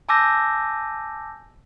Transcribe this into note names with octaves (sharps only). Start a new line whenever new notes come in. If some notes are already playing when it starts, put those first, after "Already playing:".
G#5 A5 D6 E6 G6 A#6